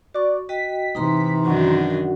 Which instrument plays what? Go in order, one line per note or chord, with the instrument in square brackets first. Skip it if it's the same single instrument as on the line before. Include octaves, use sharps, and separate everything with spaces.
[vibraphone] F#4 C#6 [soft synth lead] D5
[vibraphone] F#4 D#5 G5 [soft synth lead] B6
[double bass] C3 E3 [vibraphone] D#4 A#5 C6
[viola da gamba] F#2 D#3 D4 [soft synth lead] F#4